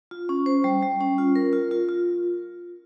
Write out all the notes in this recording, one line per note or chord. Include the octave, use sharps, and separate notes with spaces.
F4
C#4
C5
G3
G3
C#4
F4
A#4
F4
F4
F4